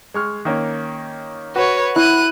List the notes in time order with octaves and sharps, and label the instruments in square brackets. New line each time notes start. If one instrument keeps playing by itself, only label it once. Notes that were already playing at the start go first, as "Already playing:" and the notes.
[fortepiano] G#3 C#6 F6
D#3 A#3 C#4
[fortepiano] F#4 [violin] B4 C#5
[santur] E4 [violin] F#6 D#7